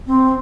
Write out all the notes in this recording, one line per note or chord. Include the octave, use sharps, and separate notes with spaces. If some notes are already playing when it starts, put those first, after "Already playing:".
C4